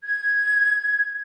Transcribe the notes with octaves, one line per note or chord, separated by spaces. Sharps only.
G#6